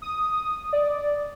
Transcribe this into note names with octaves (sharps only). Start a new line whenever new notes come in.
D#6
D5